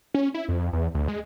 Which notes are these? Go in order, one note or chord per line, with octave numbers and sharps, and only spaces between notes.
C#4
E4
F2
E2
D2
G#3